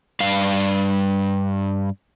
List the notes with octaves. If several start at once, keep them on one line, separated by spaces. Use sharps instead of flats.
G2 F5